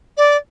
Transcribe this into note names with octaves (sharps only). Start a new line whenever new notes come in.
D5